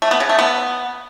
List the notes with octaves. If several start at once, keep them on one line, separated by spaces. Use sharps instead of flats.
A3
B3
C#3
A3
B3